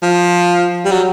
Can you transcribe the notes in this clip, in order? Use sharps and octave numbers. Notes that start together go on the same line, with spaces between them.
F3
G3
F#3